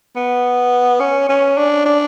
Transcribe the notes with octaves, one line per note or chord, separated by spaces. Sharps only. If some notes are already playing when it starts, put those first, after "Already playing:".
B3
C#4
C#4
D4
D4